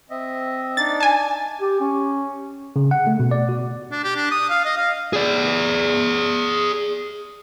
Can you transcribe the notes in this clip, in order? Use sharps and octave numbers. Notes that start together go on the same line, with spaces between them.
C4 D#5 E5
D4 D#4 D5 A6
G#5 A5
G4
C#4
C#3
F#5
A3
B2
D5
F#4
D4
G4
D4
D#6
F5
D#5
F5
G#4 D5